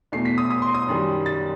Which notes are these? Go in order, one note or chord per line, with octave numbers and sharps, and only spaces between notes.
E2 B2 A3 C7
B6
D#6
D#6
C6
D#6
F#2 D#3 G3 C6
A6